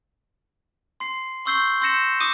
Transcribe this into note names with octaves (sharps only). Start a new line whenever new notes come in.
C6 C7
C6 C#6 E6 G6 C7 G7
C6 E6 G6 A#6 C#7 E7
D6 D#6 D#7